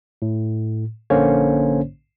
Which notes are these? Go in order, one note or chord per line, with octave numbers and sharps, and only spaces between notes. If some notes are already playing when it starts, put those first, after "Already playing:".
A2
A#1 D3 A#3 C#4 C5 C#5